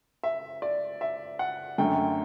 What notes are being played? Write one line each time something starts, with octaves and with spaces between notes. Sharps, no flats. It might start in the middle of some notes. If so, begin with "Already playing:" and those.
E5
D5
E5
F#5
F#2 D3 A3 G5